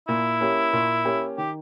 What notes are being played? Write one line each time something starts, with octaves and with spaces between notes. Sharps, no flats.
A#2 E4
A#3 C#4 G4
A#2
A#3 C#4 G4
D#3 G4